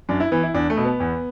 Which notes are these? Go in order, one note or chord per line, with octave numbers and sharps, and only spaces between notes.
F#2 D4
E4
E3 B3
E4
E2 D4
A3
B2
B3
E2